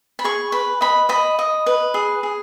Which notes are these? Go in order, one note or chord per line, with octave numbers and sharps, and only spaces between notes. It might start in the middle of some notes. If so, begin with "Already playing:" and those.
B5
G#4 C#6
B4 B5
D#5 B5
D#5 B5
D#5
B4
G#4
G#4